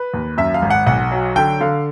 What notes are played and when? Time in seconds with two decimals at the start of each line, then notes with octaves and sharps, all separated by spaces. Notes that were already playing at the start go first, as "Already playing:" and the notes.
Already playing: B4
0.14 D#2
0.37 F#2 E5
0.54 F5
0.62 G#1
0.70 F#5
0.86 B1 F#5
1.11 F#3
1.36 D3 G5
1.60 D3 F5